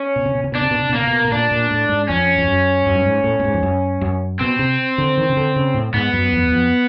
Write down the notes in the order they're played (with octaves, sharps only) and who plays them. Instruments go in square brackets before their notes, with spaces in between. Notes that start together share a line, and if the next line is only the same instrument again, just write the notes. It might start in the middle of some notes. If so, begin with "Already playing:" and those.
Already playing: [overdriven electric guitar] C#4
[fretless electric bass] B2
C3
B2
C3
[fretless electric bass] B2 [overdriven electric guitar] D4
[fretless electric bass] C3
B2
C3
B2
[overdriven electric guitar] A#3
[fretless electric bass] C3
B2
B2
[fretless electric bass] A#2 [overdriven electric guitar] D4
[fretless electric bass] A#2
A2
G#2
[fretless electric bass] F2 [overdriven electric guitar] C#4
[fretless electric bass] F2
F#2
F#2
G2
G#2
A2
A2
G#2
F2
F#2
F#2
[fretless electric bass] B2 [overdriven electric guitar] C4
[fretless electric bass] C3
D3
D#3
C#3
D3
C#3
A2
[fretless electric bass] G#2 [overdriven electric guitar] B3
[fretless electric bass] F#2
F2
E2
F2